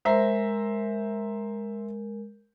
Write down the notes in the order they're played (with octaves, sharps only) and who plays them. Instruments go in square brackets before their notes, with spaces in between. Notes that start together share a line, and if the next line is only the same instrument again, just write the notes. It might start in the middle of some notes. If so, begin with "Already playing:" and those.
[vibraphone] G#3 A#4 [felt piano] C5 E5 A#5